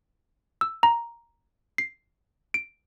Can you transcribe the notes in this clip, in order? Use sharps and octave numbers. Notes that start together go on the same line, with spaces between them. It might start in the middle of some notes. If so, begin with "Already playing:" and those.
E6
A#5
C7
D7